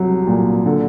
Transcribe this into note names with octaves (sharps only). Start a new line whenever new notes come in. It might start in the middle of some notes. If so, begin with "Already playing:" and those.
Already playing: C2 F#3
A#2
D3